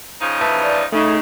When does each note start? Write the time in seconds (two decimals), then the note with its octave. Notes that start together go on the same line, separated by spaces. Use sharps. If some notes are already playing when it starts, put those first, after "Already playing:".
0.21 C#3 F3 D#4
0.41 B4 E5 A5
0.62 D5
0.92 C#3 A3 D#4